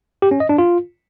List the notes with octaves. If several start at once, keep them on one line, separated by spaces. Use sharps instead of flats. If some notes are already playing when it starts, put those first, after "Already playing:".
G4
C#4
D#5
D4
F4